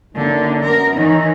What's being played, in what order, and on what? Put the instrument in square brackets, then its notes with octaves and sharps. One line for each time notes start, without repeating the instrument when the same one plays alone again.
[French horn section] F#2 D#3 A#3 [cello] D3
[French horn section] F#2 B3 [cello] A#4
[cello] D#3 E3 [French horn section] D#4 C#5